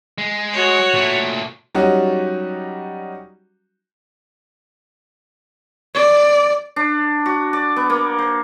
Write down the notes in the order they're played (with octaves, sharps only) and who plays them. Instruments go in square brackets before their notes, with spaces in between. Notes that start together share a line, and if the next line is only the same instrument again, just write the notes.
[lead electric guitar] G#3
[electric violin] F#4 C#5
[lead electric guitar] A#2 A3
[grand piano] F#3 G3 C#4 D#4 F#4
[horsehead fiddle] D5
[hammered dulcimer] D4
F#4
D5
B3
A#3
C5